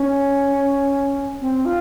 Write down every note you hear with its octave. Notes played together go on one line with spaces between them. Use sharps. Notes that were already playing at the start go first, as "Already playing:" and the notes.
Already playing: C#4
C4
F4